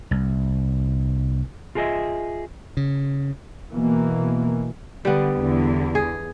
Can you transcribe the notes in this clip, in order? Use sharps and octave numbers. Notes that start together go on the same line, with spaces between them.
C2
F4 F#4 G#4 A#4 D#5 E5
C#3
B2 E3 A#3
D3 G3 B3
E2 D3
G#4